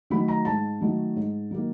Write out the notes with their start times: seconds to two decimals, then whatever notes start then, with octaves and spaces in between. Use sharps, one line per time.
0.10 D#3 F#3 A3 B5
0.28 A#5
0.45 G#2 A5
0.81 D#3 F#3 A3
1.16 G#2
1.51 D#3 F#3 A#3